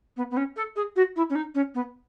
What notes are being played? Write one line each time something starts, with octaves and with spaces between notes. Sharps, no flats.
B3
B3
C#4
A4
G#4
F#4
E4
C#4
D#4
C#4
B3